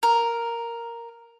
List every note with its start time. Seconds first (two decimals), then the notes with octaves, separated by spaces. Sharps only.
0.03 A#4